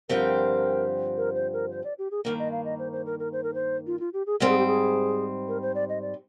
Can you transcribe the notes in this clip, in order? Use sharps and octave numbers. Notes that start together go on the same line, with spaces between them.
G2 D3 F3 C4 G4 A#4
A#4
C5
A#4
C5
D5
G4
G#4
G2 D#3 A#3 A#4
D#5
F5
D#5
C5
C5
A#4
A#4
C5
A#4
C5
F4
F4
G4
G#4
G#2 G3 C4 A#4
G#4
G4
G#4
A#4
C5
D5
D#5
D5